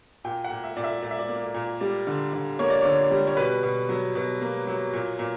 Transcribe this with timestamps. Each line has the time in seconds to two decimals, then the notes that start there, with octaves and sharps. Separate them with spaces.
0.24 A#2 G5
0.44 F#5
0.51 A#2
0.64 E5
0.77 A#2 D5
0.84 E5
1.02 A#2 D5
1.11 E5
1.19 D5
1.29 A#3
1.54 A#2
1.81 G3 D5
2.07 D3
2.33 D3
2.59 A#3 C#5
2.70 D5
2.81 D3 C#5
3.11 G3
3.27 C#5
3.37 B2 B4
3.63 B2
3.89 F#3
4.15 B2
4.41 A#3
4.67 F#3
4.93 A#2
5.19 A#2